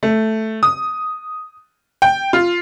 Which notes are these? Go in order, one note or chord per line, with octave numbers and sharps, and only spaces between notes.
A3
D#6
G5
F4